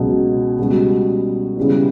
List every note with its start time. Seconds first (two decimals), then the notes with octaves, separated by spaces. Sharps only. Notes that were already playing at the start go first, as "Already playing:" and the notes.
Already playing: C#2 B2 F#3
0.58 C#2 B2 G3 B3 F#4
1.57 C#3 G3 B3 E4